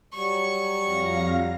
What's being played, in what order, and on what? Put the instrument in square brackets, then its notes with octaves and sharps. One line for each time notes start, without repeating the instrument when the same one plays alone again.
[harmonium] F#3 G3 [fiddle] C#6
[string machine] F2 F5 A#6